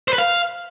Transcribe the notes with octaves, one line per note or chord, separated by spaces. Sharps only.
C5
B4
F5